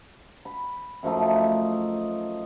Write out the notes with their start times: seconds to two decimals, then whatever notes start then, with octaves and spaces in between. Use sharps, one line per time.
0.45 B5
1.03 F#2 F3 A3 D#4